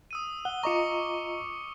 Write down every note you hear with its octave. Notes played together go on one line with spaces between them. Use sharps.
D#6 E6 D#7
F#5 G7
F4 D#5 A#5 C#6 D6 C#7